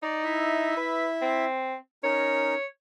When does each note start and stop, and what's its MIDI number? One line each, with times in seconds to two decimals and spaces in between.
0.03 0.74 63
0.03 0.23 74
0.24 1.45 64
0.24 1.45 76
0.77 1.07 71
1.22 1.75 60
2.04 2.54 61
2.04 2.54 63
2.04 2.54 70
2.04 2.66 73